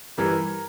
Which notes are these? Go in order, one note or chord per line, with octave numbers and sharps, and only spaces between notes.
G2 E3 G3 A#4